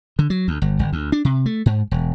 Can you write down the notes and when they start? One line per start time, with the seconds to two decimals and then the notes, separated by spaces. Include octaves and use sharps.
0.19 D3
0.30 F#3
0.48 D2
0.62 G1
0.79 G1
0.92 D2
1.12 D4
1.25 C3
1.46 A3
1.66 G#2
1.91 E1